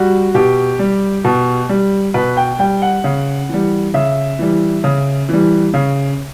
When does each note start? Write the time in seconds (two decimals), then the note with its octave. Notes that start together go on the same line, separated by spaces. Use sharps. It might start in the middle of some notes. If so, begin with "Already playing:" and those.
Already playing: G3 F#4
0.34 B2 G4
0.79 G3
1.25 B2
1.69 G3
2.14 B2 B4
2.37 G5
2.59 G3 G5
2.82 F#5
3.04 C#3
3.49 E3 G3
3.94 C#3 E5
4.39 E3 G3
4.84 C#3
5.29 E3 G3
5.74 C#3